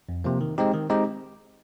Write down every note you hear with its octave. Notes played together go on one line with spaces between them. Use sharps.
F2
C3 F3 A#3
D#3
G#3 C4 D#4 G4
D#3
G#3 C4 D#4 G4